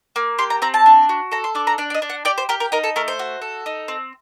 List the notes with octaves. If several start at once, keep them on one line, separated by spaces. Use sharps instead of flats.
A#3
G4 C6
A#5
C4 A#5
A5
D4
F#4
A4 A#5
C6
D4 D6
A#5
D4 D5
D5
D#5
D4
F#5
G4 D5
C5
G4 A#4
A#4
D#4 A#4
A4
A3 A#4
C5
F#4
A4
D#4
C4